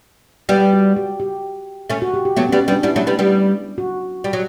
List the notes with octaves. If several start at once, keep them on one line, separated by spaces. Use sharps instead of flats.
G3 B3 G4
F#4
G4
G4
A3 C#4
F#4
G4
G4
F#3 A3 B3
C#4
G3 B3
C#4
G3 B3
D4
G3 B3 E4
F#3 A3
G3 B3
G3 B3
F#4
G3
F#3